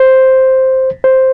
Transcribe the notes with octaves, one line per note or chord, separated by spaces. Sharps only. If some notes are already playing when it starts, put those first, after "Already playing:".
Already playing: C5
C5